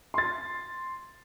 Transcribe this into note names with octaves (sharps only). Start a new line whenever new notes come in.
C6 A6